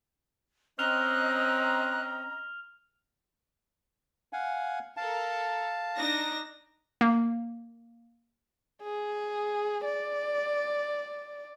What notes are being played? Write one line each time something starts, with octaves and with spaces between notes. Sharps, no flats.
C4 C#4 D#5 A#5 F6 F#6 F7
F5 F#5 G#5
A4 A#4 F5 A5
D4 D#4 A#6
A#3
G#4
D5